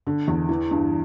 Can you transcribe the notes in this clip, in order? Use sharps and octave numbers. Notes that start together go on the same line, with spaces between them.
D3
E2
E3
G2